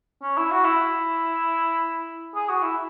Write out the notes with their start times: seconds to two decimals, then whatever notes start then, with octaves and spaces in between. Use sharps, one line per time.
0.22 C#4
0.37 E4
0.51 F#4
0.64 E4
2.35 G#4
2.49 F#4
2.62 E4